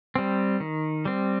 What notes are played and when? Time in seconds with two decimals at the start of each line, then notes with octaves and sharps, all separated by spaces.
0.16 G3 C4
0.60 D#3
1.05 G3 C4